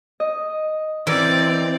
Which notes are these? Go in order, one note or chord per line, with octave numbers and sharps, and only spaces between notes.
D#5
E3 C4 A#4 D5